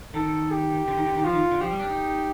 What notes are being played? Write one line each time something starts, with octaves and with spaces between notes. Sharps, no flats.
D#3 A4
G4
D3
D#3
D3
D#3
F3 F4
D#3
D3
F3 G4
G3
D4
D#4